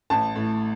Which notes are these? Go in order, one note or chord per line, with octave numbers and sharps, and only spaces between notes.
A1 A5
A2